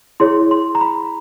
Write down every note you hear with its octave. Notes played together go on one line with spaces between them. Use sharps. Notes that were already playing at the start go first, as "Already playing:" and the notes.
E4 G#4 C#5 C6
C6
A#5
B5